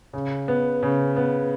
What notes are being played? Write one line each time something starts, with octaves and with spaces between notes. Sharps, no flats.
C#3
B3
C#3
B3